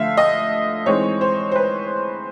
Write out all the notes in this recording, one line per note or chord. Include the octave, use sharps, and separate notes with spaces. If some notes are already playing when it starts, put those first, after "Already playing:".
Already playing: D3 F3 A3 E5 F5
D#5
E3 G#3 C4 D#4 C#5
C5
C5
B4